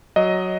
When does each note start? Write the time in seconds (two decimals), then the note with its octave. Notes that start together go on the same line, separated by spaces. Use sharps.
0.16 F#3 D#5